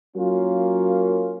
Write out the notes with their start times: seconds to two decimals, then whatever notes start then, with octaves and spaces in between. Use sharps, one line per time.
0.17 F#3 A#3 C#4 F4 A#4